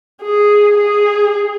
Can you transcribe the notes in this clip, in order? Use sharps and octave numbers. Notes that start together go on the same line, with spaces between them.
G#4
G#4